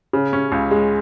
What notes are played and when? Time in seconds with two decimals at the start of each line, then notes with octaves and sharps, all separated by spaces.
0.13 C#3
0.33 C#4
0.52 C#2
0.71 G#3